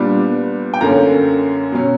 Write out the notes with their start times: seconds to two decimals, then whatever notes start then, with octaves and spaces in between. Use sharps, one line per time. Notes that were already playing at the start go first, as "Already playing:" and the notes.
Already playing: A#2 G3 B3 D4
0.74 G5
0.81 F#2 D3 A#3 C#4 A#5
1.72 B2 F#3 C#4